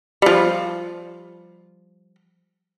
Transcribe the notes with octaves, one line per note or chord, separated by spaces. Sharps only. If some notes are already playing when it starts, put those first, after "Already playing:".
F3 G3